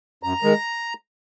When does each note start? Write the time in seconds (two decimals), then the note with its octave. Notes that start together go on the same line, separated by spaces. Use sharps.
0.23 F#2 A#5
0.43 D#3 G#3